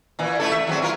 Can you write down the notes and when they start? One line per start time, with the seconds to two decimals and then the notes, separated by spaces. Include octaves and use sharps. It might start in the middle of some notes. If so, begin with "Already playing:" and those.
0.19 A#2 E3
0.40 A3 E4 A4
0.52 E5
0.67 E2 F#3 C4
0.82 E4 F4 A#4